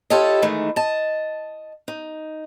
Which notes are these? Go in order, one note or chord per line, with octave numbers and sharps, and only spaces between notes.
E4 F4 G4 A4 C#5 D#5
D#3 E3 G#3 A3 D#4
D#5 A5
D#4